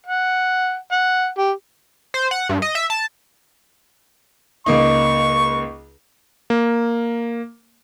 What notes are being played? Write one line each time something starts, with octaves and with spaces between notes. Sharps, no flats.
F#5
F#5
G4
C5
F#5
G2
D#5
E5
A5
C#2 A#3 D#4 C#6
A#3